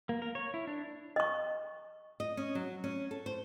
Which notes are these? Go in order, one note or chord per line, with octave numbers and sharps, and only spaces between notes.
A#3
A#4
C#5
E4
D4
D#5 C#6
D#5
C#4
F#3
C#4
A4
C5